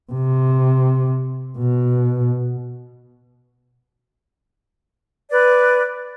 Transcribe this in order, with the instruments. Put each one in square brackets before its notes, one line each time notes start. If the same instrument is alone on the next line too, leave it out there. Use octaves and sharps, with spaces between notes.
[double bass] C3
B2
[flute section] B4 D5